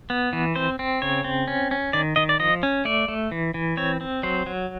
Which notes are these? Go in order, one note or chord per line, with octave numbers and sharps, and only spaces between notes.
B3
E3
C4 C5
C4
C#3 C#5
C4
C#4
C#4
D#3 D5
D#3 D#5
D5
F3 D#5
C#4
A3 D5
A3
E3
E3
C4 C#5
C4
F#3 C5
F#3